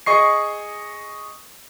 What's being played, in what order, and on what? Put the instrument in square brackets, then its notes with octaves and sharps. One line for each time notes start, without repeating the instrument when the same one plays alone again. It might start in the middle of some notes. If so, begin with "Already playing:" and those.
[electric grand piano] G#4 D#5 C#6 C7